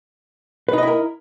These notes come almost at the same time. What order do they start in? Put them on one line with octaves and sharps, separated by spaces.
B4 D#4 D#5 E4 A#4